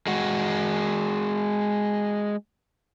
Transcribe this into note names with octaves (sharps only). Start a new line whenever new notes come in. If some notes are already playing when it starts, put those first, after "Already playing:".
G#3 F#4